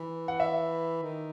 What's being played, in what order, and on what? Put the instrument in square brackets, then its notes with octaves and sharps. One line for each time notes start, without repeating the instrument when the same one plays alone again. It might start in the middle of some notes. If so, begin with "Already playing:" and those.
Already playing: [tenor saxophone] E3
[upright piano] F#5
E5
[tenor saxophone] D#3